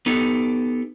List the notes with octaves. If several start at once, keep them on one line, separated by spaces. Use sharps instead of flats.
B3 D#4 G4 A4